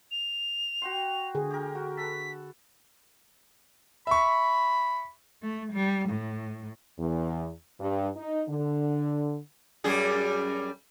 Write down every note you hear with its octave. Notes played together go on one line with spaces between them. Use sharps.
F7
F#4 G5 C6
D3 G#4
G4 A#4
F#4
A4 B4 B6
E5 B5 C#6
A3
G3
A2
E2
G2
D#4
D3
F#2 G3 G#4